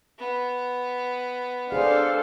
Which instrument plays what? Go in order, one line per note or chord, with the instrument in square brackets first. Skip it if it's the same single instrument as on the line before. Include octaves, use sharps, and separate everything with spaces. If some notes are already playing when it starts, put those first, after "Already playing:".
[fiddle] B3
[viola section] D4 A4 [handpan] G#4 C5 D5 [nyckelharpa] F5